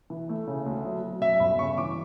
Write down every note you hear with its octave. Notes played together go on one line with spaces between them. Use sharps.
E3
A3
C#3
D2
F#3
F#3
F#2 E5
G1 B5
C#3 C#6
E3 D6